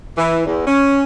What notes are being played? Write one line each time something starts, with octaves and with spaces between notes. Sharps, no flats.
E3
E2
C#4